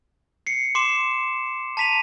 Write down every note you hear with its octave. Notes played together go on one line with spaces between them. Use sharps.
C7 C#7
C6 D6 C7 E7
A5 A#5 B6 D#7 F7